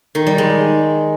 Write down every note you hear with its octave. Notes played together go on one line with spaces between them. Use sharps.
D#3
G3
G#3